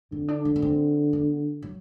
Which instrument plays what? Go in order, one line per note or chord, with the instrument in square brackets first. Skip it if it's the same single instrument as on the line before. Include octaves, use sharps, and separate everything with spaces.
[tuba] D3 [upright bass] C4
[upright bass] D4
D4
B3
C4
B3
F#3